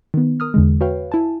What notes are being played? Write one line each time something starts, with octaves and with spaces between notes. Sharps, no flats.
D#3 B3
A#4 D#6 F6
E2 D3 G#3
F#4 B4 C#5 F5 G5
E4 G#5 A5